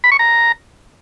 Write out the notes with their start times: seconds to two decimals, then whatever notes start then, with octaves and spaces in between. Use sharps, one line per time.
0.04 B5
0.12 C#6
0.19 A#5